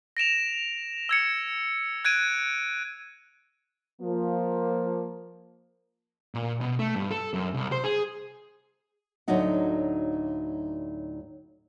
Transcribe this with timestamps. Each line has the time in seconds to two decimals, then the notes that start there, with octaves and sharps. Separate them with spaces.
0.17 A#6 D7 E7 F7
1.09 E6 G#6 C#7
2.05 F#6 G#6 D7 D#7
4.02 F3 A#3
6.35 A#2
6.61 B2
6.79 A3
6.96 G2
7.11 A4
7.33 F#2
7.54 C2
7.72 C5
7.84 G#4
9.28 D2 A2 F#3 D4 D#4 F#5